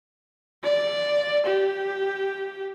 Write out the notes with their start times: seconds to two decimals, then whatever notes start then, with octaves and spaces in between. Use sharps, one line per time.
0.64 D5
1.46 G4